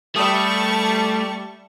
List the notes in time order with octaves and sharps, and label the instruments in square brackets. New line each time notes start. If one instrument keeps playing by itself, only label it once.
[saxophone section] G3 [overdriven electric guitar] A3 [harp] E5 B5 D#6 [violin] A5 C#6